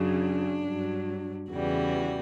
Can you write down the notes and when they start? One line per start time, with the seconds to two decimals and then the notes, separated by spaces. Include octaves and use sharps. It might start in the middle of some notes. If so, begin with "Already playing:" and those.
Already playing: F#2 C#3 F#3 D4
0.64 G2 F#3
1.51 E2 C#3 E3 G3 F#4